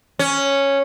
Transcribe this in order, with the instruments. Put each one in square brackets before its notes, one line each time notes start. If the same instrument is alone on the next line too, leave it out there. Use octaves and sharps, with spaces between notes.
[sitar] C#4